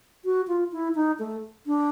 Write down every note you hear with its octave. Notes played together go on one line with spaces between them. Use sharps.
F#4
F4
E4
D#4
A3
D4